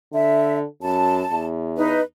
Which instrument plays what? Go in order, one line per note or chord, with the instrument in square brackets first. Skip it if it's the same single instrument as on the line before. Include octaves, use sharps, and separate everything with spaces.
[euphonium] D3 [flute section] E5
[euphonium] F#2 [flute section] A5
[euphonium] E2
[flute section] D#4 B4